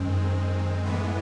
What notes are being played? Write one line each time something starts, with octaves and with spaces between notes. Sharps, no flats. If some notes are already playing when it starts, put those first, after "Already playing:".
Already playing: F#2 D#3 G#3 C4
A2 E3 G#3 B3